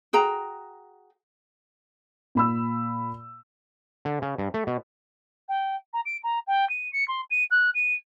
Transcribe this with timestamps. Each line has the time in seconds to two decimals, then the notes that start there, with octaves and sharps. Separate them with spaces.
0.13 F#4 G#4 G5 A#5
2.35 A#2 B5 E6
4.05 D3
4.22 C#3
4.38 G2
4.54 A3
4.67 B2
5.48 G5
5.93 A#5
6.05 D7
6.23 A#5
6.47 G5
6.69 D#7
6.92 C#7
7.08 C6
7.30 D#7
7.50 F#6
7.74 D#7